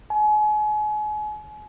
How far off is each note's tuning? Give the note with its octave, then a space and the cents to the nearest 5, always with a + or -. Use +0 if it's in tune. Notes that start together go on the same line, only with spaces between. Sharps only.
G#5 +35